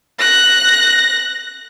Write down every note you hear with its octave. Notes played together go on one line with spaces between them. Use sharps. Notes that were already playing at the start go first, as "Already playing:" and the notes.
F#6 A#6